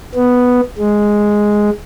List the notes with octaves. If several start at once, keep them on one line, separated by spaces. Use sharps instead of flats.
B3
G#3